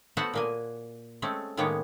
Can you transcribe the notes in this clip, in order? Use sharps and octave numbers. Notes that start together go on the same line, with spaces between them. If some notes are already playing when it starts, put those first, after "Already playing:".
A3 B3 F#4 C5 C#5 F#5
A#2 A#3 G#5
G#3 A3 C4 C#4
A2 D#3 G#3 A#3 B3 C#5